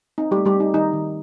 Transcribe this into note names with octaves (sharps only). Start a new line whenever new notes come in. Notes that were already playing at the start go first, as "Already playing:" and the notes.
C4 D#4
G3 A3 G4
G3 G4
C4 D#4
D#3 D#4
D#3